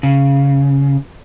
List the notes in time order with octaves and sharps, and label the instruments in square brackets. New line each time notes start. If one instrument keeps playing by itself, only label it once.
[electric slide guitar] C#3